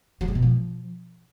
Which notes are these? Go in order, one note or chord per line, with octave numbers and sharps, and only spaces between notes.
F#3
G#3
B2
F3